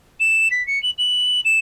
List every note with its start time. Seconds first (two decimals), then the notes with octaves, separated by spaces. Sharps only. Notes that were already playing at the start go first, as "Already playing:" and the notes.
0.19 E7
0.50 B6
0.66 C#7
0.82 F#7
0.98 F#7
1.44 E7